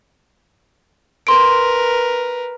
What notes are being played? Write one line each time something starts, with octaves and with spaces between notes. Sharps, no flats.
A#4 B4 C6 D7